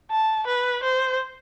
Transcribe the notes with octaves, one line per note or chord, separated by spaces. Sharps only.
A5
B4
C5